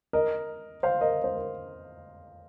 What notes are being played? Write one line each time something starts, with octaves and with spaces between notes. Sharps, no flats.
A#4 D#5
C5 F5
A#4 D#5
C5
A#4